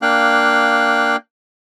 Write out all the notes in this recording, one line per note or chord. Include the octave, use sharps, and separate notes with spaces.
A#3 D4 F5 G5 F#6